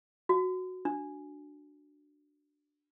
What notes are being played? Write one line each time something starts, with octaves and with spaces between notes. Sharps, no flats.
F#4
D4